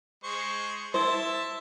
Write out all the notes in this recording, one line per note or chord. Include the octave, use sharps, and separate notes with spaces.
G#3 C5 C#6
E4 C5 E5 A5